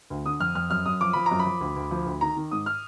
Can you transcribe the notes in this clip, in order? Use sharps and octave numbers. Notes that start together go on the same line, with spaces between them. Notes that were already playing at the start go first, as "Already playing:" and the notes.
D2
D3 D#6
F2 F6
F2 F6
F#2 F6
F#2 D#6
F3 D6
F3 B5
A#5
F#2
B5
F3
D2
D2
F3
D2
D#3 A#5
D#3
G#2 D#6
F6